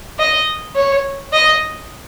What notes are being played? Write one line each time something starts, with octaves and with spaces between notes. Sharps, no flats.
D#5
C#5
D#5